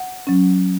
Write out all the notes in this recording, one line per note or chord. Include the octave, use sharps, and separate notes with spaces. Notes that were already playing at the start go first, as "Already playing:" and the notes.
Already playing: F#5
F#3 C#4